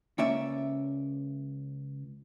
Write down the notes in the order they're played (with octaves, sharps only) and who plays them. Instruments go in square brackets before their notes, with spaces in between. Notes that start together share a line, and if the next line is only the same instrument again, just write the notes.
[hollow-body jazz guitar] C#2 A#3 C#4 D5 E5